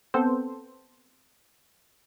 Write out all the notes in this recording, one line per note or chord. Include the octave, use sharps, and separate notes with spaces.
B3 C4 A4 C5